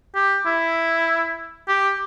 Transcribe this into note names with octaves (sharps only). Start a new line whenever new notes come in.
G4
E4
G4